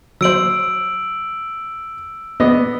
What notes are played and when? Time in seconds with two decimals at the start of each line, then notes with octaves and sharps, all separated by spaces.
0.21 F#3 C5 E6 D7 F#7
2.40 B3 D5 D#5